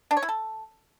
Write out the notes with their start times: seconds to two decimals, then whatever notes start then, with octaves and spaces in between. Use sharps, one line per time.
0.11 D4
0.17 C#5
0.23 E4
0.29 A4